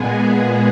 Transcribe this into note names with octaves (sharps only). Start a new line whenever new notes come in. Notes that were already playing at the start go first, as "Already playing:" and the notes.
Already playing: A#2 G#3 B3 G#4